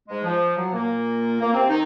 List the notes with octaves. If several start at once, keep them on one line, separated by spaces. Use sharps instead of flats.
G#2 G#3
F3
F#3
A#2 A#3
A#3
C3 C4
D#3 D#4